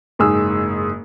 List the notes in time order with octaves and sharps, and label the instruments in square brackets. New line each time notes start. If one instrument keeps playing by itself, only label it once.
[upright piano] F#1 G#2 G#4 E6